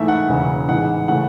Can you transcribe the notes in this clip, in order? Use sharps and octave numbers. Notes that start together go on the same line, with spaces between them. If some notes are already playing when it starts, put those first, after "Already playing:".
Already playing: G#2 E3 A3 E5
F#5
E1 E2 C#3 E3
A1 G#2 E3 G#3 F#5
C#3 E3 A3 F#5